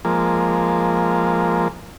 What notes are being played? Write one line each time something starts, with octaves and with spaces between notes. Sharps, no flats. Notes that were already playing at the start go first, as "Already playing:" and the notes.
F3 G#3 A#3